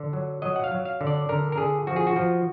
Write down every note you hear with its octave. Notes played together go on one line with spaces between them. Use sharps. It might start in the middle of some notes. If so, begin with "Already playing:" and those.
Already playing: D3
F#3
F#3 D#5
F#5
F5
F#3
F5
D3
D5
D3 A#4
A#4
D3 G#4
F3 F#4
G#4
F#4
F3